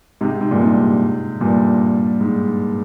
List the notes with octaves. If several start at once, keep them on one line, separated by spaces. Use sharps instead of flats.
G#2 C3
G#2
G2 A#2
G#2 C3
G2 A#2
G#2